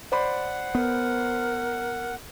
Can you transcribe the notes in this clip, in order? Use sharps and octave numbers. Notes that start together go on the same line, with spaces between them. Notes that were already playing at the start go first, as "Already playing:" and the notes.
C5 D5 F#5 B5
B3 A#4